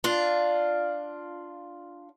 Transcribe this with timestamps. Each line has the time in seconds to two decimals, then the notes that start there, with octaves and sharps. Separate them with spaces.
0.04 D4 F4